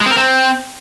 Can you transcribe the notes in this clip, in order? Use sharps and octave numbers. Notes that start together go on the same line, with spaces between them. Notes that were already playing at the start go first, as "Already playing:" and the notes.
G#3
C4
A#4
C4